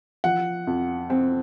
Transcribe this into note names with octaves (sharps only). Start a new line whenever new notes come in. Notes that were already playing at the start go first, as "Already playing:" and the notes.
F3 F#5
F2
C4